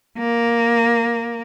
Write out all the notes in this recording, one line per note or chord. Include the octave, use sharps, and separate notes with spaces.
A#3